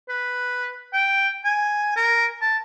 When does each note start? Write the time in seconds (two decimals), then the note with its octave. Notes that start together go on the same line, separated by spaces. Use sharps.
0.09 B4
0.93 G5
1.45 G#5
1.96 A#4
2.42 A5